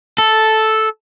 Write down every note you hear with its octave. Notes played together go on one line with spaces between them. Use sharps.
A4